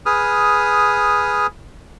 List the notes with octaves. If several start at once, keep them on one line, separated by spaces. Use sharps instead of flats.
G#4 B4 D#6 F6